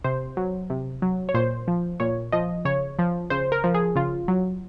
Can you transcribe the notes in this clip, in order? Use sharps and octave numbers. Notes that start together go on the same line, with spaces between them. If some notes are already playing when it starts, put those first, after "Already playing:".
C3 C5
F#3
C3
F#3
C#5
A#2 C5
F3
A#2 C#5
F3 D#5
C#3 C#5
F3
C#3 C5
A#4
F3
G#4
C#3 F4
F#3